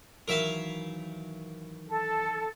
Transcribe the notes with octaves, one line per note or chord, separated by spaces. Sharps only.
D#3 E3 F#3 A#4 E5 F5
A4